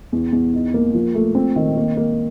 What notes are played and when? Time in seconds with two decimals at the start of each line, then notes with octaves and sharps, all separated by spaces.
0.13 E2
0.32 E2
0.54 D#4
0.74 A#3
0.94 F3
1.14 A3
1.35 C4
1.56 D#3
1.77 A#3
1.97 A#3